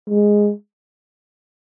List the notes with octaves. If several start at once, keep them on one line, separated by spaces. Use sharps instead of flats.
G#3